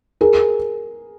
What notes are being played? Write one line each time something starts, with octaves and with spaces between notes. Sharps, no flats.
G#4 A#4